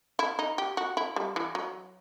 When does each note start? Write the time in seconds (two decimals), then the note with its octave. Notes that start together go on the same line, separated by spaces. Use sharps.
0.19 E4
0.39 D#4
0.58 G4
0.77 F#4
0.97 E4
1.16 G3
1.36 E3
1.55 F#3